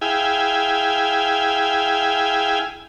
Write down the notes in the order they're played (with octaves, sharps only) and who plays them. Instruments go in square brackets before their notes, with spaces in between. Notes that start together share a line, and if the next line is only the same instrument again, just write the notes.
[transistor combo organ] E4 G#4 F5 G5 G#5